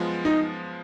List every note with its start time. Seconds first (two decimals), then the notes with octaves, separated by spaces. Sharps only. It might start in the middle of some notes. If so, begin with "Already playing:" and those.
Already playing: F#2 F3 G#3 B3 F4
0.25 D#4